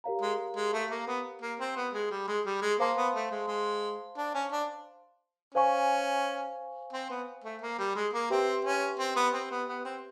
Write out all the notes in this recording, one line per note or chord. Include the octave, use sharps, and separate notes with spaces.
G4 A#4 C#5 F5 A#5
G#3
G#3
A3
A#3
B3
A#3
C4
B3
G#3
G3
G#3
G3
G#3
A#3 C5 F5 A5 C6
B3
A3
G#3
G#3
D4
C#4
D4
C#4 C5 F5 G#5 C#6
C4
B3
A3
A#3
G3
G#3
A#3
C4 G4 B4 E5 G5 C6
C#4
C4
B3
C4
B3
B3
C4